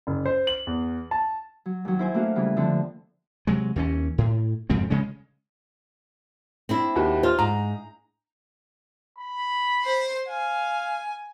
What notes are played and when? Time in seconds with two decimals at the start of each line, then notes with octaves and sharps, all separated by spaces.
0.07 F#1
0.26 C5
0.47 F#7
0.67 E2
1.11 A5
1.66 F#3
1.85 D#2 F#3
1.99 E4 C5 G#5
2.14 A3 A#3 D4 F#4 F5
2.35 C#3 E3 G3
2.56 F2 D3 F3 C4
3.47 C3 F#3 G#3
3.76 D#2 E3 C4 C#4
4.18 A2
4.70 F2 G#2 C#3 C4
4.90 C#3 G#3 C#4
6.69 C4 D4 E4
6.96 D#2 F#4 G4
7.23 F4 C5 F6
7.39 G#2 A#5
9.19 B5
9.83 C5 C6
10.29 F5 G#5